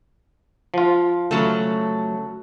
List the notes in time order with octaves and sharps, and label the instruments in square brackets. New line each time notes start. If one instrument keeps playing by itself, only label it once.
[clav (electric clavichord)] F3 F4
[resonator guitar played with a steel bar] C#3 F#3 A3